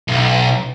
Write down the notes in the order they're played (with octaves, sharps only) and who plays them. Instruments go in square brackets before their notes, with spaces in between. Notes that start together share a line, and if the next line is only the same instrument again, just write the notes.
[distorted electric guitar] B1